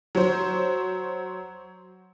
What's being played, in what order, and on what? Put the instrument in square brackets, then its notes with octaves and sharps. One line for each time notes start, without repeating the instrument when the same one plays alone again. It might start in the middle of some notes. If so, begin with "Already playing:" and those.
[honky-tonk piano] F#3 C5